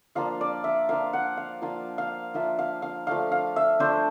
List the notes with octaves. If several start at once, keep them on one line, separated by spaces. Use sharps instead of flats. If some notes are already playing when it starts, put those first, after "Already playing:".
F3 A#3 D4 F4 F5
D5
E5
F3 A#3 D4 F4 F5
F#5
F5
F3 A#3 D4 F4 F5
F5
F3 A#3 D4 F4 E5
F5
F5
F3 A3 D4 F5
F5
E5
F3 A3 D4 C5